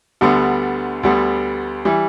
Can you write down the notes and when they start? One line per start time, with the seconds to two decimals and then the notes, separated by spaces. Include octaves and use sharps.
0.21 D2 D3 G3 B3
1.03 D2 D3 G3 B3
1.85 E3 G3